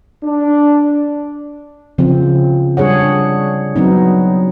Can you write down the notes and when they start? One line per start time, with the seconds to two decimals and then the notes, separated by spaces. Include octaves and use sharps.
0.24 D4
1.98 C#3 F3 C4
2.77 G3 D4 G#4 C#5 F#5
3.76 F#3 B3 C4 D#4